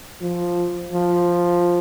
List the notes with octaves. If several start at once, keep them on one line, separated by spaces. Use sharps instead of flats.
F3
F3